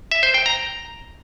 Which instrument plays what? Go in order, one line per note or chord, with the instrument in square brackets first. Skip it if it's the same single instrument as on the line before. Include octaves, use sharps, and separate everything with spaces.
[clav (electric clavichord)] E5
C5
G5
A#5